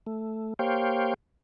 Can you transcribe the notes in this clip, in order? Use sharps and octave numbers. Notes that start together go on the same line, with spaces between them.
A3
A#3 G4 C5 C#5 F5 G5